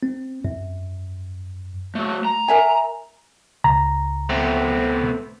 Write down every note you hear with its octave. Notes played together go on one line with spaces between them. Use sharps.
C4
F#2
F#3 A3
A#5
A#4 E5 G#5
C#2 A#5
A3 B3 C4